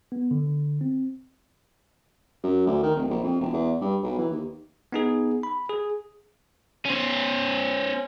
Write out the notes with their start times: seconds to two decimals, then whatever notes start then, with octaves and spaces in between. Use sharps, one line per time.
0.12 B3
0.31 D3
0.81 C4
2.43 F#2
2.67 D2
2.83 D#3
2.96 D1
3.09 A#1
3.23 F2
3.41 E1
3.53 E2
3.81 G2
4.02 B1
4.18 E3
4.31 D#2
4.92 B3 D#4 G#4
5.43 B5
5.69 G#4
6.85 C#4 C5